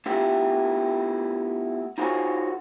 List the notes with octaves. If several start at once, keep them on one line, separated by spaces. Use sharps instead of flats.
A3 B3 D4 E4 F4 G4
D#4 F4 F#4 G#4 C5 C#5